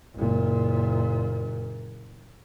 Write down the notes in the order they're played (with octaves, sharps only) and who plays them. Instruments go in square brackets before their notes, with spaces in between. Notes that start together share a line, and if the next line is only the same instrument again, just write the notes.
[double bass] F#1 A#2